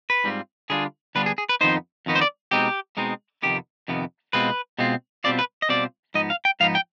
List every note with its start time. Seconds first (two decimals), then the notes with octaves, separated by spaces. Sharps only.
0.10 B4
0.24 G#2 G3 C4 F4
0.70 D3 G3 B3 D4 F4 G#4
1.15 D3 G3 B3 D4 F4 B4
1.26 G#4
1.38 G#4
1.49 B4
1.61 F2 D#3 B3 D#4 C5
2.06 F2 D#3 B3 D#4
2.15 C5
2.21 D5
2.51 B2 G#3 C4 D#4 G4
2.97 B2 G#3 C4 D#4
3.42 F2 C3 D#3 B3 G4
3.88 F2 C3 D#3 B3
4.33 B2 G#3 C4 F4 B4
4.78 B2 G#3 C4 F4
5.24 B2 G3 C4 F4 D5
5.39 B4
5.62 D#5
5.69 B2 G3 C4 F4 D5
6.14 G#2 F3 B3 D#4 D#5
6.30 F5
6.45 G5
6.60 G#2 F3 B3 D#4 F5
6.75 G5